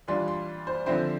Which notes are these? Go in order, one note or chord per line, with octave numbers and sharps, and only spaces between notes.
E3 G3 D4 F4 C6
C6
C5
D3 F3 C4 E4 C5